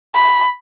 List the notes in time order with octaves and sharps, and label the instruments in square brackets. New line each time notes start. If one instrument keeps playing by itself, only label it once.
[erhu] B5